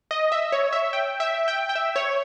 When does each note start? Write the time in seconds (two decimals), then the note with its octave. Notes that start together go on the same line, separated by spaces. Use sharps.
0.11 D#5
0.32 E5
0.52 C#5
0.73 E5
0.93 G5
1.20 E5
1.48 G5
1.69 G5
1.75 E5
1.96 C#5